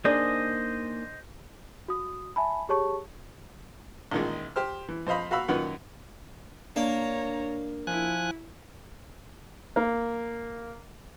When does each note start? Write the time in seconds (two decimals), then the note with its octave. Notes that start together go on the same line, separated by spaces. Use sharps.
0.05 A#3 D4 D#4 G#4 C5 D#5
1.88 F#4 D#6
2.36 E5 G#5 A5 B5
2.69 G4 G#4 C#5 A5 C#6
4.11 A1 A#2 D#3 G#3
4.56 G4 C5 F6
4.88 E3
5.07 F2 C5 D#5 F5 B5
5.31 F#4 F5 B5 E6
5.48 F#2 A#2 D#3 B4 F#5
6.76 A#3 D4 C#5 A#5
7.87 F3 E4 G#5 F#6
9.76 A#3